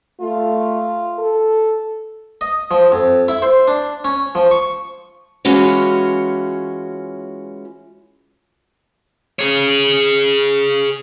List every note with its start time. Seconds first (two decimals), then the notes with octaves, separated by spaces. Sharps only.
0.21 A3 F4
1.19 A4
2.41 D#5
2.71 F3
2.92 F2
3.28 E4
3.42 C5
3.68 D4
4.04 C#4
4.35 F3
4.51 C#6
5.45 E3 G#3 C#4 F4 F#4 C#5
9.39 G#4 C#5